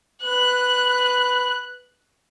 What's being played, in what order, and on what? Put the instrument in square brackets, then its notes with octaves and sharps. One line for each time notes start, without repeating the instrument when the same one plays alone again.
[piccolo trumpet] B4 [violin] F#6